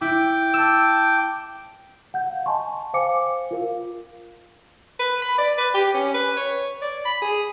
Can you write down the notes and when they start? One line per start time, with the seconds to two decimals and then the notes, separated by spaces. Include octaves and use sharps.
0.01 E4 G5 D6
0.54 A5 E6
2.14 F#5 G6
2.30 F5
2.46 D#5 G#5 A5 C6 C#6
2.94 C5 F5 G5 G#5 D6 C#7
3.51 F4 A#4 F5
5.00 B4
5.22 B5
5.38 D5
5.58 B4
5.74 G4
5.94 C#4
6.14 B4
6.37 C#5
6.82 D5
7.06 B5
7.22 G#4